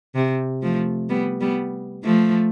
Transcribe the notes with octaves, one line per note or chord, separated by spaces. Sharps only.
C3
F3 A3
G3 B3
G3 B3
F3 A3